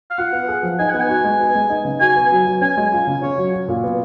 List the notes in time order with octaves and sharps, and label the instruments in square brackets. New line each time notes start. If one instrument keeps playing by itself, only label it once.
[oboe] F5
[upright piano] F4 [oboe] F#5
[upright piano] B3
G#4
F3
[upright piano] D#4 [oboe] G#5
[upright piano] B3 [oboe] F#5
[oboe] G#5
[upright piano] F#4
G#3
B3
G#3
D#4
C#3
[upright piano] F#4 [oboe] G#5
[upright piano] B3
F#3
F#3
[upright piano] C#4 [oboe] G#5
[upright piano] G#3
F4
C#3
[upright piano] C#4 [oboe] C#5
[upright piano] F#3
F#4
A#2
B3